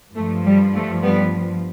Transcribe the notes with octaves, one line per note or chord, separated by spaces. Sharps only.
G2 F3 A3
G3
A3
G3 B3